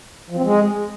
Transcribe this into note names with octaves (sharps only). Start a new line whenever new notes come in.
F3
C4
G#3